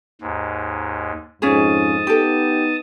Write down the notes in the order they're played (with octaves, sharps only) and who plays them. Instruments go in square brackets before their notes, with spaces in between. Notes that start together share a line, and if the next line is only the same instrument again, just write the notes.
[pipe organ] D#2 G#2
[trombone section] F2 G#2 [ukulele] C#4 F4 G#4 [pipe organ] A5 D#6
[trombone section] B3 D#4 [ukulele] G4 A4